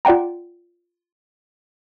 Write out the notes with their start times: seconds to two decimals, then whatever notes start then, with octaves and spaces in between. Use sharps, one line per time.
0.05 F4 D5 F#5 G5 A#5